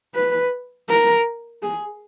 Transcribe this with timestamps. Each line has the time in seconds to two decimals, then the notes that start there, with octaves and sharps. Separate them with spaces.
0.15 B4
0.89 A#4
1.63 G#4